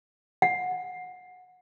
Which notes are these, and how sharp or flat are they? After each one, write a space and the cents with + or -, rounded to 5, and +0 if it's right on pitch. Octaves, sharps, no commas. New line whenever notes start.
F#5 -20